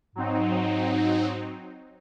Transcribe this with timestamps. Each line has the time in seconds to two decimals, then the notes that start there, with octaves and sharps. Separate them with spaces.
0.16 G#2 F#3 C4 D#4